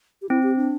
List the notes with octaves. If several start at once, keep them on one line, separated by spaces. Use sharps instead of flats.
G4
C4 E4
G4
D4